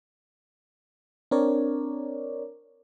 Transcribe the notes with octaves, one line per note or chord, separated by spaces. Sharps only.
C4 D4 A#4 C#5 D5